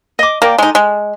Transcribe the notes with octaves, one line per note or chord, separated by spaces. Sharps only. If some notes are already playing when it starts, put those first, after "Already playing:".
D#5 D6
A#3 A#4 D5 G5
G#3 D#4 A4
G#3